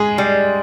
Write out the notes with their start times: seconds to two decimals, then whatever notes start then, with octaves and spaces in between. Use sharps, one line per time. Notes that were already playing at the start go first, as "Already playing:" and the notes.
Already playing: G#3 G#4
0.18 G3